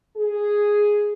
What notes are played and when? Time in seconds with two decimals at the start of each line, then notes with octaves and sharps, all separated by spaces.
0.17 G#4